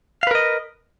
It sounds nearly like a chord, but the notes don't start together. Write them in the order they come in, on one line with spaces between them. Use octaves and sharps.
F5 B4 A#4 D#5